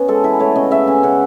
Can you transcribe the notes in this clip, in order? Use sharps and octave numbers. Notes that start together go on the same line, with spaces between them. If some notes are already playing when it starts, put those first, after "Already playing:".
Already playing: B3 C#4
G#3 A4
E3 B4
A3 C#5
C#3 D#5
C#3 E5
C#3 G#5
C#3 F#5